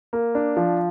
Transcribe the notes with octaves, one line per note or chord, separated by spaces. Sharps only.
A#3
D4
F3